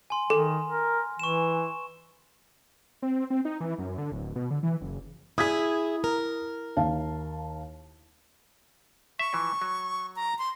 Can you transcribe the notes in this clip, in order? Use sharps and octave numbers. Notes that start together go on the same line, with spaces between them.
G#5 C6
D#3 A4
A#4
E3 C#6 E7
C4
C4
D#4
E3
F#2
D3
D1
B2
D3
E3
F#1
E4 G#4 D#6 G#6 B6
A#4
D#2 F5 A5
E5 C#6
E3 F3
F#3
A#5
C6